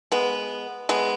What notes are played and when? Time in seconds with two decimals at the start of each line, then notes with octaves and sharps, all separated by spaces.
0.12 G#3 B3
0.89 G#3 B3